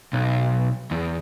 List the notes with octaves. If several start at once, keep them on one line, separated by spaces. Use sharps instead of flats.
B1
E2